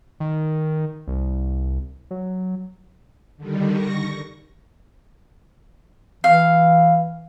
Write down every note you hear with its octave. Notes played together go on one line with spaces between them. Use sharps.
D#3
C2
F#3
D3 D#3 G3
C#6 A#6
E3 F5